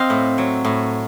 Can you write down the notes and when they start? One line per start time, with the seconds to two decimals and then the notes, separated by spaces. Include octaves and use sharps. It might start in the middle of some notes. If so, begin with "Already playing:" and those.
Already playing: C4 D#5 F5
0.10 A2
0.38 F#3
0.65 A2